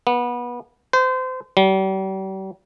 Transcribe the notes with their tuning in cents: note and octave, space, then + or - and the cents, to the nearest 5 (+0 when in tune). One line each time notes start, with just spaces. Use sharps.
B3 -25
C5 -30
G3 -40